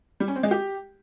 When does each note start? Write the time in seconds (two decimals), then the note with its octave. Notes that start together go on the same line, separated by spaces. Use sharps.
0.20 G3
0.28 C#4
0.36 C4
0.43 G#3
0.51 G4